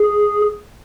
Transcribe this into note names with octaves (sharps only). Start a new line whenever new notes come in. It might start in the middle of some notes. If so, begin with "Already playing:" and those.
Already playing: G#4